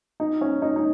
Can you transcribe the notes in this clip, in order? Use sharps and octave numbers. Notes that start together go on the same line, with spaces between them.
D#4
C#4
D#4
D#4